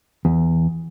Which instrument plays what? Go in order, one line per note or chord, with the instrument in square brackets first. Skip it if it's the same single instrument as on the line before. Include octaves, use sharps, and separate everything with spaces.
[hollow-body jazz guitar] E2